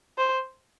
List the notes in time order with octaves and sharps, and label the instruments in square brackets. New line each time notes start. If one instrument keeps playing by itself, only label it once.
[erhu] C5